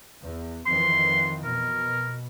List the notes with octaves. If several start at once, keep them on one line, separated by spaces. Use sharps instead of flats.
E2
F2 D#3 E3 C6
B2 A#4